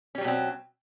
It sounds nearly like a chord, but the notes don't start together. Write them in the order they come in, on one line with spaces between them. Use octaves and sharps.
C#4 G3 F#3 B2 C4